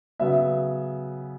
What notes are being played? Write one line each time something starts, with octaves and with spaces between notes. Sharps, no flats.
C#3 F#3 B3 E5